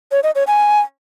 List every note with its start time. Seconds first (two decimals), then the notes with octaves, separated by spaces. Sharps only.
0.12 C#5
0.23 D#5
0.35 C#5
0.47 G#5